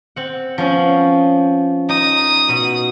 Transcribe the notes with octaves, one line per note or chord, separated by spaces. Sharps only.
C4 F#5
F3 B3 C#4
D#4 D#6
B2